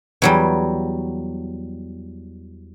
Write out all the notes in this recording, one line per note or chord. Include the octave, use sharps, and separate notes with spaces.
E2 F#3 G3